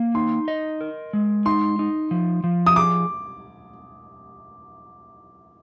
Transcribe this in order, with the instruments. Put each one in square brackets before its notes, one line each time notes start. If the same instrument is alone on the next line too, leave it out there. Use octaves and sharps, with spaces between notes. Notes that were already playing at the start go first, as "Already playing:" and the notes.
Already playing: [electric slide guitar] A#3
[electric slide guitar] D#4 [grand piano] C6
[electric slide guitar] D#5
A#4
G#3
[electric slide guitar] D#4 [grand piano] C6
[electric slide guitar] D#4
F3
F3
[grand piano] D#6
[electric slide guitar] G#4 [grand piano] D6